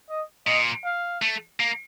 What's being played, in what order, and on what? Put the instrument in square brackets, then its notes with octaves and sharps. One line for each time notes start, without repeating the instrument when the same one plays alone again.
[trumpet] D#5
[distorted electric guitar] A#2 [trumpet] D#5
[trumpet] F5
[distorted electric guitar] A3
A#3